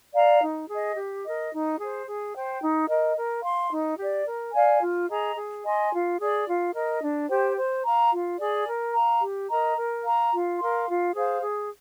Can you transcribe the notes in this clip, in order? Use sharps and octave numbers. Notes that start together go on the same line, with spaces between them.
D5 F5 A#5
D#4
G#4 D#5
G4
A#4 D#5
D#4
G#4 C5
G#4
C5 G5
D#4
A#4 D#5
A#4
F5 C6
D#4
G4 D5
A#4
D5 F5 G#5
F4
G#4 D#5 A#5
G#4
D#5 G#5 C6
F4
G#4 D5
F4
A#4 D#5
D4
G4 C5 G5
C5
F5 A#5
F4
G#4 D5 G#5
A#4
F5 A#5
G4
A#4 D#5 A#5
A#4
F5 A#5
F4
A#4 F5 C6
F4
G#4 C5 F5
G#4